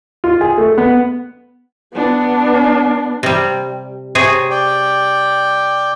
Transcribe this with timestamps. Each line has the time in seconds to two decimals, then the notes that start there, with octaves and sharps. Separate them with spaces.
0.24 F4
0.41 G#4
0.58 A3
0.78 B3
1.94 B3 D4
3.23 C3 G3
4.15 C3 G#4 C#5
4.50 D5 G5